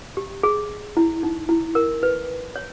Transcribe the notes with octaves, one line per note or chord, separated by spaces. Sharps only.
G4
G#4
E4
D#4
E4
A#4
B4
C#5